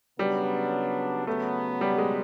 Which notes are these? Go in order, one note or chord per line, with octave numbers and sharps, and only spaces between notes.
C#3 F#3 G3 B3 D4
C#3 F#3 A3 B3
G3
G#3